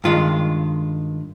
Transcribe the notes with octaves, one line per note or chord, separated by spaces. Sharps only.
G2 D#3 G#3 F4